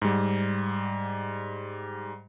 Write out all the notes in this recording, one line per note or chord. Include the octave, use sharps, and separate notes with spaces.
G#2 G3